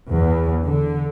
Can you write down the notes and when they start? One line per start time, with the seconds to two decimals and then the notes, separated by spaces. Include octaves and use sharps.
0.12 E2
0.64 D3